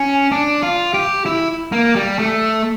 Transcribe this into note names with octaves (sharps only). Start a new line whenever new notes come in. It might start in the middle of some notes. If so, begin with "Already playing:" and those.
Already playing: C#4
D4
F4
G4
E4
A#3
G3
A3